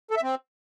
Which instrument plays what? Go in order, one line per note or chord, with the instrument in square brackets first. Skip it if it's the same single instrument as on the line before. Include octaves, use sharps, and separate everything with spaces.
[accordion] A4
E5
C4